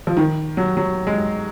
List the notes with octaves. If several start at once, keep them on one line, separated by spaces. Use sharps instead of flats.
F3
D#3
F#3
F#3
G#3